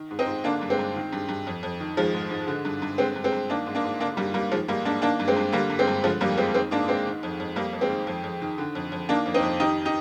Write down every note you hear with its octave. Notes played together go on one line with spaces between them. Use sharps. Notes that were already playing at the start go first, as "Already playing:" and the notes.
Already playing: D#3
G#2
C4 D#4
G#2
D3 A#3 D4
G2
G#3 C4
G2
D#3
G2
G2
F2
F2
D#3
D#3 F3 G#3
G#2
G#2
D3
G2
G2
D3 G#3 C4
G2
G#3 C4
G2
D#3 A#3 D4
G#2
A#3 D4
G#2
D3 A#3 D4
G2 G3 A#3
G2 G3 A#3
D#3 F3 G#3
G#2 G3 A#3
G#2 A#3 D4
D#3 A#3 D4
G2
G#3 C4
G2
D3 G3 A#3
G2
G#3 C4
G2
D3 F3 G#3
F2 G3 A#3
F2 G#3 C4
D#3 G#3 C4
G#2 A#3 D4
G#2 G#3 C4
D#3
F2
F2
F2 G3 A#3
F2
G#3 C4
D#3
F2
F2
D#3
D3
F2
F2
D#3 A#3 D4
F2
C4 D#4
F2
D#3 D#4 G4
D#4 G4